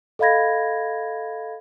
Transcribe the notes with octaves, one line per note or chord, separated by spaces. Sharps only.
A4 D#5 F5 B5 G#6 A#6